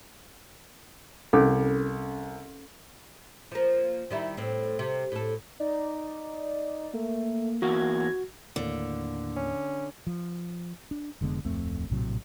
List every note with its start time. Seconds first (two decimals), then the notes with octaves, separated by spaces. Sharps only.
1.33 C2 C#4 A4
3.52 F3 A#3
4.10 D#3 G3 E4
4.37 A2 C4
4.79 C3
5.12 A2 A4
5.60 D#4 D5
6.94 A3 A#3
7.62 E2 A#3 F#4 G#6 A#6
8.56 D#2 A2 D3 A#3
9.36 C#4
10.07 F3
10.91 D4
11.21 F1 D3 G#3 B3
11.45 D1 F2 A3 C4
11.90 A#1 A2 C3 F#3